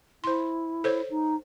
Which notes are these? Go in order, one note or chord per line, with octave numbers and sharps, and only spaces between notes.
E4 C5 C6
A4 C5 C#5
D#4